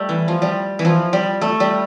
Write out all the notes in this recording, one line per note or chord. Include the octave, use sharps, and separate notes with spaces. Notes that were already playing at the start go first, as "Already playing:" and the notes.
Already playing: G3 A3
E3
F3
G3
E3
F3
G3
A3
G3